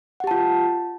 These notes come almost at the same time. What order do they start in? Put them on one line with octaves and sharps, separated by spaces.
F#5 G4 A5 F4